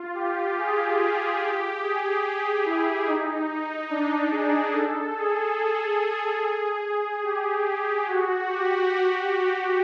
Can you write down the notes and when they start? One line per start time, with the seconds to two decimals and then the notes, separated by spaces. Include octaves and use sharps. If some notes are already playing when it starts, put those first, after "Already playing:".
Already playing: F4
0.14 G4
0.57 G#4
1.40 G4
1.82 G#4
2.23 G#4
2.66 E4
3.07 D#4
3.90 D4
4.32 G#4
4.73 A4
5.15 G#4
7.23 G4
7.65 G4
8.06 F#4
8.48 G4